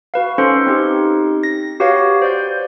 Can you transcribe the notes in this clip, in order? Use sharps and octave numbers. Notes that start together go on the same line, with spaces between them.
F#4 B4 F5
C#4 D#4 A4 C5 C6 C#7
C4 D#4 G4
A#6
F#4 G4 B4 C#5 F5
C5 D5 G6